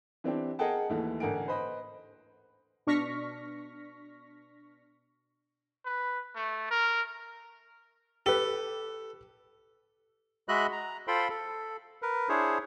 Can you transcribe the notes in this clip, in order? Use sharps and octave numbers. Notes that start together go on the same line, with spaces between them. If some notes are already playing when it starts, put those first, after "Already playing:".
E3 C4 D4 G4
G#4 A#4 D#5 F#5 G5 A5
D#2 E3 A3
A1 D3 A#4 F#5 G#5 D7
B4 C5 D#5 B5
B2 D4 C#6 F6 A#6 B6
B4
A3
A#4
G4 A4 B4
G#3 F#4 D#5 E5 B5 F#6
A#5
F4 A4 C5 G5 B5 C6
A4
A#4 B4
D4 E4 G#4 C5 C#5